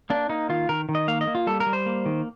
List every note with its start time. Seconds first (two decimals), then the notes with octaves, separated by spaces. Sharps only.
0.10 A#3 D4
0.29 A#3 D#4
0.49 D#3 F4
0.69 D#3 A#4
0.89 D#3
0.95 D#5
1.08 A#3 F5
1.21 D#5
1.27 A#3
1.35 F4
1.47 G3 A4
1.60 A#4
1.67 G3
1.73 C5
1.86 A#3
2.06 D#3